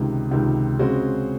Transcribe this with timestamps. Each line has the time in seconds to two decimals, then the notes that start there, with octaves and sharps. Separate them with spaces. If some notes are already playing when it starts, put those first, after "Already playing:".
Already playing: C#2 C3 D#3
0.31 C#2 C3 D#3
0.79 C#3 G#3 C4 F#4